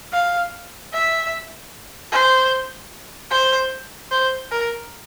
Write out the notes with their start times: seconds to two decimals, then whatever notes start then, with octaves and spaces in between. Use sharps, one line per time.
0.13 F5
0.93 E5
2.12 C5
3.31 C5
4.11 C5
4.52 A#4